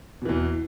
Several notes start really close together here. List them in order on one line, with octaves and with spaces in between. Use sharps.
B2 E3 E2